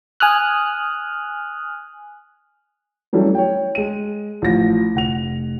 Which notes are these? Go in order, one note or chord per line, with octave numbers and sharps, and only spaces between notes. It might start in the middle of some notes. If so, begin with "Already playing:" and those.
G#5 D#6 F6 F#6
E3 F#3 G3 A3 C#4
C#5 G5
G#3 D#7
A1 F3 A#6
F1 F#5 F7